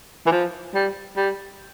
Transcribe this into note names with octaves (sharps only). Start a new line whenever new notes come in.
E3
F3
G3
G3